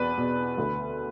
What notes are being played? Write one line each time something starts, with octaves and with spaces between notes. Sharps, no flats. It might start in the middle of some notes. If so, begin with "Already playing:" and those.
Already playing: E2 B2 B4 D5
B2
D2